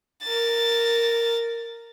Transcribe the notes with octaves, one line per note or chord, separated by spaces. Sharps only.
A#4 A6